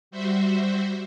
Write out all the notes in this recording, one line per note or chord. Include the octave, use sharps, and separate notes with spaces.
G3 F#4 C5 E5